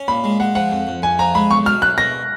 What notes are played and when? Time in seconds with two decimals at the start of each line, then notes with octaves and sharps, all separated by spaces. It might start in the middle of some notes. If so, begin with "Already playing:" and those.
Already playing: C#4
0.08 A#2 B5
0.24 G#3
0.40 G#3 F#5
0.55 F3 F#5
0.72 F2
0.87 F2
1.02 F2 G#5
1.19 F3 A#5
1.35 G#3 B5
1.50 B1 C#6
1.66 F#3 F6
1.82 B1 F#6
1.98 B2 A#6